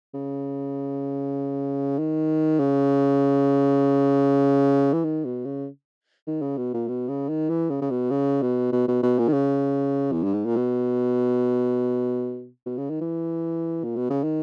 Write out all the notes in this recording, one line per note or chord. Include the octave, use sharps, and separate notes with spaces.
C#3
D#3
C#3
E3
D#3
B2
C#3
D#3
C#3
B2
A#2
B2
C#3
D#3
E3
C#3
C#3
B2
C#3
B2
B2
B2
B2
A#2
D#3
C#3
E2
G2
G#2
A#2
B2
B2
C#3
D#3
E3
A#2
B2
C#3
D#3